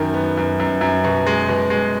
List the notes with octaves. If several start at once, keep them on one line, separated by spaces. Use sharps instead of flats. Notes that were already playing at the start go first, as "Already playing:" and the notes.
Already playing: F#2 D#3
B3
F#2
F#2
F#2
B2
G#3
B2
G#3